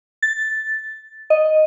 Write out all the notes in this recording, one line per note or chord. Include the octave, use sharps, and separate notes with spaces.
A6
D#5